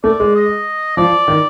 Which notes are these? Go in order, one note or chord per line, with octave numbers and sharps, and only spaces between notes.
A3 D5
G#3
D#5
F3 D5
D#3